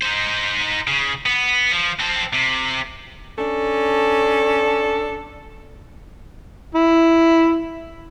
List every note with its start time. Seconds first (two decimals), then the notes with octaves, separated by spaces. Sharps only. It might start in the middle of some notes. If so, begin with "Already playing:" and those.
0.01 D#4 C5
0.87 C#3
1.26 B3
1.71 F3
1.99 C4 A4
2.33 C3
3.37 C#4 D4 A4
6.75 E4